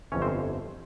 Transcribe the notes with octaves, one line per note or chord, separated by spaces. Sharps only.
G1 F2 E3 C#4 C#5
C4 C5